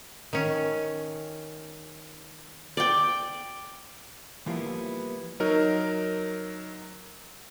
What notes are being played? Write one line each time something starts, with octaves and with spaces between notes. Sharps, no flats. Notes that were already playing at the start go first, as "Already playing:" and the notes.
D#3 C#4
D5 G5
E3 F3 G3 A#3 B3 E4
F#3 D#4 A#4